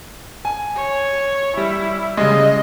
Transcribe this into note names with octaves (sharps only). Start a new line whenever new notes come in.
G#5
C#5
G3 E4
C#3 G3 G#3 D#5